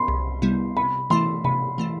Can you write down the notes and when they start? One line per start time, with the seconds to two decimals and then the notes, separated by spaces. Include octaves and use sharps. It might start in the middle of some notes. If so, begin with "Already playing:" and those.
Already playing: B5 C6
0.08 C2
0.42 C3 G3 B3 E4
0.77 C3 B5
1.10 E3 A3 E4 C6
1.45 C3 B5
1.78 E3 A3 E4